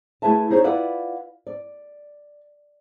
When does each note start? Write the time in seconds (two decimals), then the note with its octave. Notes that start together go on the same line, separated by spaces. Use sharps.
0.22 A3 E4 G#4 B4 E5 A5
0.50 D#4 G#4 C5 C#5
0.64 E4 F4 B4 D5 E5 F#5
1.47 D5